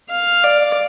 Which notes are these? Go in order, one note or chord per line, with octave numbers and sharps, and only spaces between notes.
F5
D5